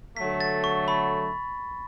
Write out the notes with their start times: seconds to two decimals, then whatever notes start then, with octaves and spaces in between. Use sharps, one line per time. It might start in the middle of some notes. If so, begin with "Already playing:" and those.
0.17 D3 F#3 A3 B6
0.41 A6
0.64 C#6
0.88 B5